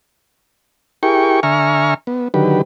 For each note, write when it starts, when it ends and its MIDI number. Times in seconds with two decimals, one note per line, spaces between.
1.03 1.40 64
1.03 1.40 67
1.03 1.40 68
1.03 1.40 70
1.03 1.40 79
1.03 1.40 85
1.43 1.94 50
1.43 1.94 76
1.43 1.94 80
1.43 1.94 82
1.43 1.94 85
1.43 1.94 89
2.07 2.28 59
2.34 2.62 50
2.34 2.62 51
2.34 2.62 54
2.34 2.62 67
2.34 2.62 71